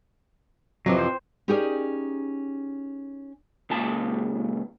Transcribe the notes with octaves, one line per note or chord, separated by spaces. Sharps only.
F2 C3 E3 F#3
C5 G5
C#4 D#4 G4 G#4 A#4 D5
C#2 A#2 A5